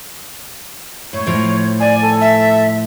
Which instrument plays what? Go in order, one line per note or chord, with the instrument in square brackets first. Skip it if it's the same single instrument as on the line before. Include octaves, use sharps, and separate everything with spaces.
[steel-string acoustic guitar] A2 [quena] C#5
[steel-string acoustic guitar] A2 F3
[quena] D5 [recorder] G#5
[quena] A4
[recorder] E5